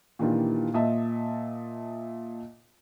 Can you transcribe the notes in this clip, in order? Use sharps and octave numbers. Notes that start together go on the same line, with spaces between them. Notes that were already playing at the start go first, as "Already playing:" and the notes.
A#2 D#3 E3 D4 F4 G4
A#2 D#5 E5 A5